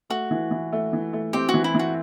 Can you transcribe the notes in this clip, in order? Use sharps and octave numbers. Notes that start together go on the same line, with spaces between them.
A3 F#4
E3
E3
A3
E3
A3
C4 G4
F#4
E3
E4
E3 F#4